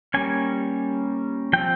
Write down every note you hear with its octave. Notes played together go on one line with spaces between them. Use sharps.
G3 A#3 C#4 G#5
F3 C4 G5